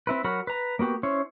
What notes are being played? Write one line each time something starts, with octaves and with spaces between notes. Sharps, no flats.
C4 E4 B4
F#3 F#4 A#4 B5
B4 A#5
A#3 B3 F#4 G4
C#4 E4 C5 C#5